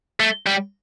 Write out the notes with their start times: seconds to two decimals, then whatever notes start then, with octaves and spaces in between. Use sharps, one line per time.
0.20 A3
0.47 G3